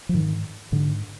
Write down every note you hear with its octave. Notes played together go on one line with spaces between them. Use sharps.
F3
G#2 D#3
G#2 D3